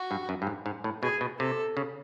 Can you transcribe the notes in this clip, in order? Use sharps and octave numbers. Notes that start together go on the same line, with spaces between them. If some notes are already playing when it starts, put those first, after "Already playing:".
Already playing: F#4
G2
F#2
G2
G#2
G#2
A2
B2 G#4
B2
C3 A4
C#3